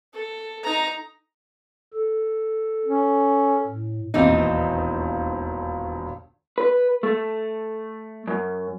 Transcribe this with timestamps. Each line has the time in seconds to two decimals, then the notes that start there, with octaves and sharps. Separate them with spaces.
0.13 A4
0.63 D#4 A#5
1.93 A4
2.86 C#4
3.67 A2
4.14 E1 A#1 D#2 E3 C4 D#4
6.58 B4
7.03 A3
8.28 F#2